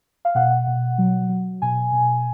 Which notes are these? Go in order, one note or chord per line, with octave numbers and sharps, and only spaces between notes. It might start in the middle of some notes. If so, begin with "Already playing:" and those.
F5
B2 F#5
B2
F#3
F#3
B2 G#5
B2